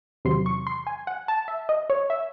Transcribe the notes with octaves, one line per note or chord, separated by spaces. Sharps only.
E2 C3 D#3 F#3 C6
C#6
C6
G#5
F#5
A5
E5
D#5
C#5
E5